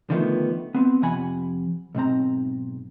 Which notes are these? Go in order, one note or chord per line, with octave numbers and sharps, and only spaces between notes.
D3 D#3 F3 A3 B3
B3 C4
F2 C3 F3 F#5 G#5 B5
B1 G#2 C4 A#5